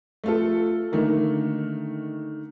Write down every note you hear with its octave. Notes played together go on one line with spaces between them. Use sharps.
A3 F4 A4
D3 D#3 A3 A#3